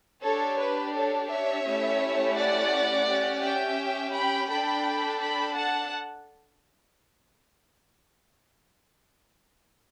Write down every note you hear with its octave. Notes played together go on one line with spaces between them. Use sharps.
D4 G4 A4 C#5
B4
A4 C#5
C#5 E5
A3 C#4 E4 G4
D5 F#5
C#4 G4
E5 G5
G5 B5
D4 A4 G5 B5
G5 B5
F#5 A5